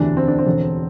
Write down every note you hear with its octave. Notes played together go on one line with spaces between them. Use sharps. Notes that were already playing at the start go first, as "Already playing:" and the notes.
Already playing: E1 D2 C3 E3 D4
C4
D4
C4
E1 E2 D3